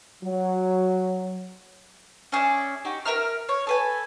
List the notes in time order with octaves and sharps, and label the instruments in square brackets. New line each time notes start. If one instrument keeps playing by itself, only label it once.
[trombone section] F#3
[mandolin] C#4 G#4 D5 E5
D#4 F#4 G4
A#4 E5 A#5 F6
C#5
A4 B4 G#5